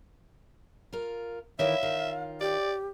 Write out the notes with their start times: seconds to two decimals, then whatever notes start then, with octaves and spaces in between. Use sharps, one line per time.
0.93 F4 A#4
1.59 D#3 E3 E4 C#5 E5 F5
1.83 D#3 F4
2.41 G4 D5